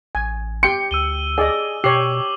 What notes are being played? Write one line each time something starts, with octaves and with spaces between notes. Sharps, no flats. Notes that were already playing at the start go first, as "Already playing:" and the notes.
A1 G#5
G4 G5 C6 C#7
D2 E6 D#7 G7
G#4 D5 D#5
B2 G4 C#5 D6 C7 F#7